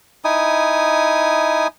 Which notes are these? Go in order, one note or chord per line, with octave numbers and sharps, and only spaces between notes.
D#4 E4 G#5 D#6